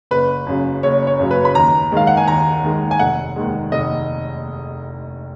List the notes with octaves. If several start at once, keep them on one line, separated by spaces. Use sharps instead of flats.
F#1 B4
F#2 C#3 F#3
F#1 C#5
C#5
F#2 C#3 F#3
B4
B5
D#2 A#5
D#3 G#3 F5
F#5
G#5
D#2 A#5
D#3 G#3
G#5
F1 F#5
D#2 D#3 G#3
F1 D#5